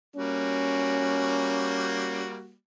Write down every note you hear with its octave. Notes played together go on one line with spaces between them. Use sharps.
G3 A#3 C#4 F#4